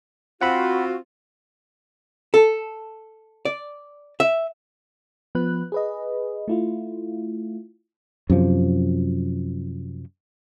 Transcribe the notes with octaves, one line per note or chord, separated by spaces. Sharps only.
C4 F4 F#4 F#5 B5
A4
D5
E5
F3 B3 B4 F#6
G#4 B4 D#5
A3 E4 F4
F#2 C3 F3